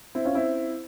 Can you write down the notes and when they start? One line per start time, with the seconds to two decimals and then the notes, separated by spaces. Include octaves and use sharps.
0.15 C4 E4
0.25 C#4 F4
0.35 C4 E4